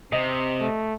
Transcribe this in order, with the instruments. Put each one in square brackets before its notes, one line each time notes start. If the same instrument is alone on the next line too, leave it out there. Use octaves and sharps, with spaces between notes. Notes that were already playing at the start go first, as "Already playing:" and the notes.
[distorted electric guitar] C3 [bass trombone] C4 [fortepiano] D#5
[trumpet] A3